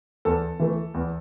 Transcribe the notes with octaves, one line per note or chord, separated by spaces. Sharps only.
E2 A4
E3 A3
E2